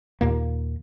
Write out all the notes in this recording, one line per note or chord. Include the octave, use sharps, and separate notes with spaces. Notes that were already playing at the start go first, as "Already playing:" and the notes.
D#2 A#2 A#3